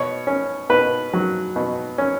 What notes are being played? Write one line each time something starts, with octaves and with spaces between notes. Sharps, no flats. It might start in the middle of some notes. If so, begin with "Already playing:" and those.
Already playing: B2 C#5
C#4
B2 B4
F#3
B2
C#4